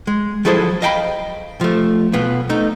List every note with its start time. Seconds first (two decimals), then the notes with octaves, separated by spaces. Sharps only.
0.07 G#3
0.45 F3 F#3 E4 G#4 A4 C5
0.82 D#5 F5 G5 A5 B5
1.61 F3 A3
2.13 B1 B2 B3 F4
2.49 A3 D#4